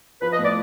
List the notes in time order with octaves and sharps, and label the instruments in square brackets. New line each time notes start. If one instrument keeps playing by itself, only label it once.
[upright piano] F3 [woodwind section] B4
[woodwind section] D#5
[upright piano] A2
[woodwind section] D5